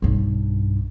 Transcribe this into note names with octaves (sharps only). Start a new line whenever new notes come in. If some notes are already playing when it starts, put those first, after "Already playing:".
B1 G2